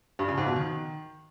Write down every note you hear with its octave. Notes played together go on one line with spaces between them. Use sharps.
G2
C#3
G#2
B2
D#3